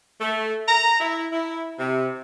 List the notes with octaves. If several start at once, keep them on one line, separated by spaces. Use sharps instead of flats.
A3
A#5
E4
E4
C3